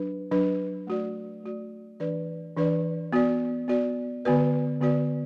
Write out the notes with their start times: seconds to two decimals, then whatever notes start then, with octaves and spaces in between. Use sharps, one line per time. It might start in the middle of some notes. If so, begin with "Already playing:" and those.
Already playing: F#3 D4 B4
0.32 F#3 D4 B4
0.87 A3 F#4 D5
1.43 A3 F#4 D5
2.00 E3 D4 B4 D5
2.56 E3 D4 B4 D5
3.13 B3 F#4 D5
3.68 B3 F#4 D5
4.25 D3 B3 F#4 B4 D5
4.81 D3 B3 F#4 B4 D5